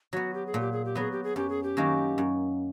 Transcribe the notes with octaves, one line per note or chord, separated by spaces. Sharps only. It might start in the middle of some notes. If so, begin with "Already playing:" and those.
F#3 B3 F#4
G4
G#4
A#2
G4
G#4
G4
F#3 B3 G#4
G4
G#4
F#2 G4
G#4
G4
D#3 F#3 A#3 C#4
F#2